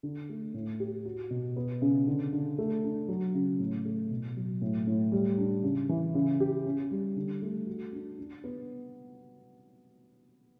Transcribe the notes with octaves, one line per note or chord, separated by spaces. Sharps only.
D3
A3
A2
G4
F#4
B2
B3
C#3
D3
D3
A3
D4
F#3
C#3
A2
A3
B2
F#3
A2
A2
G3
D4
C#3
E3
C#3
G4
C#4
G3
D3
A3
F#4
D4
D4
B3